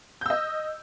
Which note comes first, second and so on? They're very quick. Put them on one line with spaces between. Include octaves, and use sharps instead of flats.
G6 E6 D#5